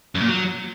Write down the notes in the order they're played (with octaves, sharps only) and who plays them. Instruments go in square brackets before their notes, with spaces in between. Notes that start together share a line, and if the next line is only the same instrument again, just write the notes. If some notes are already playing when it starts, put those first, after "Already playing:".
[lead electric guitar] F#2
A#2
F#3